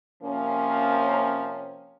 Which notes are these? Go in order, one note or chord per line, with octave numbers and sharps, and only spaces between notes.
C3 F3 A#3 C#4